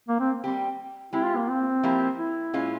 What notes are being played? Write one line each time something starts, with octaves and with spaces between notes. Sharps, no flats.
A#3
C4
G3 C4 G4
G#3 C4 E4 G4
F4
A#3
C4
F3 A#3 E4 G4
E4
A#2 G#3 C#4 F4